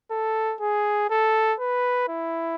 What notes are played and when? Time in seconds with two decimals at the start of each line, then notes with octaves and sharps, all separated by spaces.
0.11 A4
0.61 G#4
1.10 A4
1.60 B4
2.09 E4